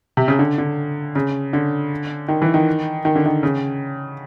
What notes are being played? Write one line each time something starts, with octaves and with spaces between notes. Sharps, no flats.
C3
C#3
D3
D3
C#3
D3
D#3
E3
D#3
D#3
D3
D#3
C#3